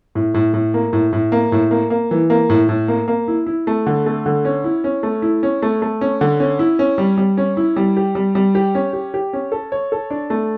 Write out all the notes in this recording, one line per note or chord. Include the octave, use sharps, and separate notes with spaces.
A2
A2
A2
A#3
A2
A2
A#3
A2
A#3
A#3
E3
A#3
A2
A2
A#3
A#3
E4
E4
A3
D3
A3
D3
C#4
E4
C#4
A3
E4
C#4
A3
A3
C#4
D3
C#4
E4
C#4
G3
G3
C#4
E4
G3
G4
G3
G3
G4
C#4
G4
G4
C#4
A4
C#5
A4
D4
A3